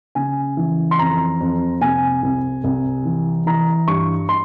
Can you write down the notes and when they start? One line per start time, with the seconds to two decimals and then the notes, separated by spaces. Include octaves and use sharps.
0.15 C#3 G#5
0.57 E3
0.91 C6
0.99 F2 A#5
1.41 F2
1.81 C3 G#5
2.23 C2
2.64 C2
3.05 E3
3.46 E3 A#5
3.88 G2 C#6
4.29 C6